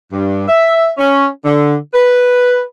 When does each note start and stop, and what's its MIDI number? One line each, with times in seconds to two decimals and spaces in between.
0.12 0.47 43
0.48 0.90 76
0.98 1.26 61
1.45 1.75 50
1.94 2.61 71